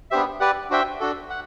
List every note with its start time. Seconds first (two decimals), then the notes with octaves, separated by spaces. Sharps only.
0.11 B3 D4 G4 C5 E5
0.40 G4 B4 D5 F#5
0.70 D4 F#4 C5 E5 G5
1.00 D4 F#4 A4
1.30 F#5